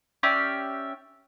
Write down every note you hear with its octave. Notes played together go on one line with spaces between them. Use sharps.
C#4 G4 D5 E5